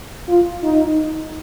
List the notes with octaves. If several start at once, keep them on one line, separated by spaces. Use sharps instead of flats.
F4
D#4